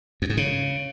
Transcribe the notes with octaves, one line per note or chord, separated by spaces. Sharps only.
F2
G#2
C#3